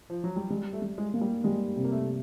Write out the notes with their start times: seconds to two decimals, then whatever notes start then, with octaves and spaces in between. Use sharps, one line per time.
0.10 F3
0.24 F#3
0.36 G3
0.50 G3 G#3
0.73 A3
0.82 G3
0.98 G#3
1.14 A#3
1.21 G3
1.44 G3 G#3
1.76 C3
1.84 A#3
1.92 A3